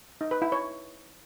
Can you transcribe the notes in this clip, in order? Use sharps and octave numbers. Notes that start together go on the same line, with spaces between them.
D#4
B4
E4
C#5